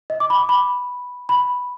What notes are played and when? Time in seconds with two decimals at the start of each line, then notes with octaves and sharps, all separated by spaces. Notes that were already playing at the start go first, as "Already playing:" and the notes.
0.10 D#5
0.20 D6
0.30 B5
0.39 D6
0.49 B5
1.29 B5